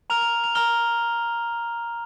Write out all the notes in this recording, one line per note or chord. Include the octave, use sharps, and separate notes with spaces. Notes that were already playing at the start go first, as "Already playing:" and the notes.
A#5 F6 F7
F7
F7
A#5 F6 G7